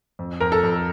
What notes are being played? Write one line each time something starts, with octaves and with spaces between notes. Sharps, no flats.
F2
F2 A#4
A4
F2